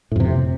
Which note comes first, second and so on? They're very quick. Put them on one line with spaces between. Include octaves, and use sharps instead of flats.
A2 F2 C3